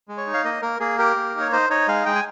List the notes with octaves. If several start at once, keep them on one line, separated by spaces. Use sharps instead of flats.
G#3
C#5
D#4
F5
A#3 D#5
A#3 A#4
A#3 G#4
G4 A#4
A#3
D#4
C#5
D#4 C5
D#4 C#5
G#3 F5
G#3 G5
G#5